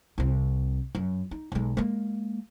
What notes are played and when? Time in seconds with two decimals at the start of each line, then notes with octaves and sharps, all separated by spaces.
0.18 C2 C4
0.95 F#2
1.31 D#4
1.52 B1 G#3
1.77 G#3 A#3